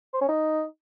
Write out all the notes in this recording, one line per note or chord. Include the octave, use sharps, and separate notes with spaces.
C5
C#4
D#4